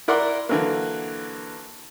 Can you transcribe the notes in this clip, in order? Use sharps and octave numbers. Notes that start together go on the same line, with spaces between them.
E4 A#4 D5 F#5 C6
D3 E3 F#3 A#3